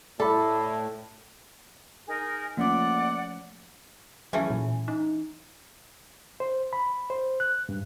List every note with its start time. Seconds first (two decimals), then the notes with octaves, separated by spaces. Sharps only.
0.20 A2 A4 D5 B5
2.07 D#4 G#4 A#4
2.57 F3 A3 A#3 C#4 D5 F#5 D6
4.33 E3 F#3 A3 C#4
4.50 A#2
4.88 D#4
6.40 C5
6.73 B5
7.10 C5
7.40 F#6
7.69 G2